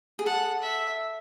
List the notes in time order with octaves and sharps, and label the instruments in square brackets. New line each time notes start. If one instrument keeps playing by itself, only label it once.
[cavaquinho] G#4
[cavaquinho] A4 [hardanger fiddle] F#5
[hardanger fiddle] E5